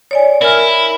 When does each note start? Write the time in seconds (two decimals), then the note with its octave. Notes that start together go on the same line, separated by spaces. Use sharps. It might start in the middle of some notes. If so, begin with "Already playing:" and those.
0.11 C#5 D5 G#5
0.42 E4 A#4 G#5 F6